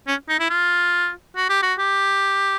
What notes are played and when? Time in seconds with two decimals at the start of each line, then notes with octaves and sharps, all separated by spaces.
0.07 C#4
0.29 D#4
0.39 E4
0.50 F4
1.36 F#4
1.49 G4
1.62 F#4
1.79 G4